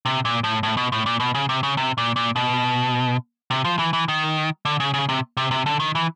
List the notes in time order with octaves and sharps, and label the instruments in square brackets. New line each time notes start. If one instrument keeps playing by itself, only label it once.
[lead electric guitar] C3
A#2
A2
A2
B2
A2
A#2
B2
C#3
C3
C#3
C3
A#2
A#2
B2
C3
F3
E3
E3
D#3
D3
C#3
C#3
C3
C3
C3
D3
D#3
E3